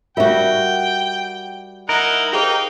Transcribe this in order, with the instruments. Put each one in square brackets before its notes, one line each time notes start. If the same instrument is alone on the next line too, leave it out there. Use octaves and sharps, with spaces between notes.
[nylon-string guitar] G3 F#4 [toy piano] F4 A#4 E5 [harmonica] G5
[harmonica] D#4 E4 F#5 [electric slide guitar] A#4
[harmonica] D#4 F5 G5 [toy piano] G4 G#4 C5